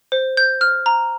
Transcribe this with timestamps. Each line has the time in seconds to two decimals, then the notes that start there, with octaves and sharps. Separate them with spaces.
0.12 C5
0.37 G6
0.61 F6
0.86 A#5